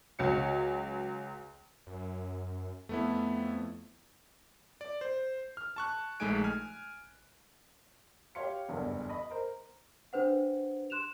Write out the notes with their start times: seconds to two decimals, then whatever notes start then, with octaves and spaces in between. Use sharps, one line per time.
0.19 C#2 F#3 C#7
1.87 F#2
2.89 F2 A3 B3 E4
4.81 D5
5.01 C5
5.57 F6
5.76 A5 C#6 F#6
6.20 A#1 G#3 A3 D#4 G#5 D7
6.44 G#5 F6
8.35 G4 C#5 F5 C6 C#7
8.69 F#1 E2 G2 D3
9.09 D#5 B5
9.31 A#4 C5
10.13 D4 B4 C5 F#5
10.90 C6 F#6 E7 F7